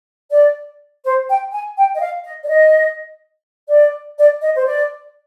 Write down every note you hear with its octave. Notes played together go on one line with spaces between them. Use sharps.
D5
C5
G5
G#5
G5
D#5
F5
D#5
D5
D#5
D5
D5
D#5
C5
D5